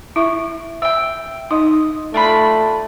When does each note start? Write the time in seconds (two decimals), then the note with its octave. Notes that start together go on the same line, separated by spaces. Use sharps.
0.16 E4 E5 C#6
0.82 E5 G5 E6
1.51 D#4 D#5 D#6
2.14 A3 D4 F4 B5